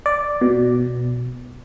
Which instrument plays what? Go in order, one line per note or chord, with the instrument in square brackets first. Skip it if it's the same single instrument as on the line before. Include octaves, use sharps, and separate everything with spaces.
[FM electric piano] D5
B2